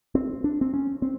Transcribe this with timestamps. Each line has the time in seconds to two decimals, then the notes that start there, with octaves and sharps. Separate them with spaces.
0.15 C4
0.44 D4
0.61 C4
0.74 C#4
1.02 C4